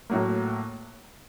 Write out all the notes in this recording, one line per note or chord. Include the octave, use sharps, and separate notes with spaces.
A2 F#3 A#3